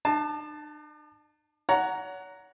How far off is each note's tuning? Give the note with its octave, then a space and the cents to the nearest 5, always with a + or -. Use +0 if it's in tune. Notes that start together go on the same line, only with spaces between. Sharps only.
D4 +45 A5 +0
C#5 +35 F#5 +0 A#5 +0